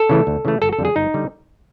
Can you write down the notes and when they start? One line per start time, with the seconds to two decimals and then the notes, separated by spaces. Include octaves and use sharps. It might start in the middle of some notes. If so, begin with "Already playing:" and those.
Already playing: A4
0.10 C#3 E3 A3
0.27 D2
0.45 C#3 E3 A3
0.62 G1 A4
0.73 A4
0.79 F2 D3 G3
0.85 G#4
0.96 G1 D#4
1.14 D3 G3